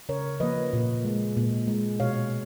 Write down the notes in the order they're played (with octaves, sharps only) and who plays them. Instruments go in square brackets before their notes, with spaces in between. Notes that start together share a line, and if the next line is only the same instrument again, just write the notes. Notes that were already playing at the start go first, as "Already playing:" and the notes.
[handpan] C#3 A#4 C#5
F3 A#3 B4 D#5
A#2
G#3
A#2
G#3
B2 C#5 F5